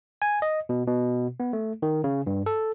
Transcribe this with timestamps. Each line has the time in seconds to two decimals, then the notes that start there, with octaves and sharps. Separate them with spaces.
0.22 G#5
0.42 D#5
0.69 B2
0.87 B2
1.40 B3
1.53 A3
1.82 D#3
2.04 C#3
2.27 G2
2.46 A4